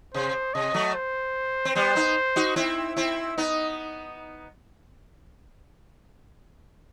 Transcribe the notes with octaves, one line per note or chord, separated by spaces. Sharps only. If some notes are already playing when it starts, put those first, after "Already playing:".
C3 C5
C3 D#5
F#3 A3
C5
C4
G3 B3 C5
B3 D#4
D#4 F#4
C4 E4 E5
C4 E4
B3 D#4 D#5